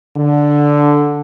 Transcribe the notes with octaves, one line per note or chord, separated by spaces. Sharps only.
D3